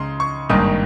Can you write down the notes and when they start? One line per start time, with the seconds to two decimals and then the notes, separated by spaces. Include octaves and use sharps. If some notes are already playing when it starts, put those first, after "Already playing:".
Already playing: C#2 C#3 D#4 C6
0.20 C#6
0.49 G#1 G2 D#3 A#3 D#6